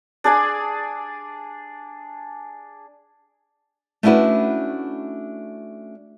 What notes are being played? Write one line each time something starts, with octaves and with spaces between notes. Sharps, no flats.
D4 G#4 D5 G#5
A3 C#4 D4 E4 F#4 B4